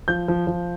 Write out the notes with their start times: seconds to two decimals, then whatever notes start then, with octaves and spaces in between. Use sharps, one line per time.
0.08 F3 G6
0.28 F3
0.47 F3